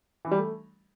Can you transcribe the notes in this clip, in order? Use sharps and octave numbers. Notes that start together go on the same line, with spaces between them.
E3
G3
A3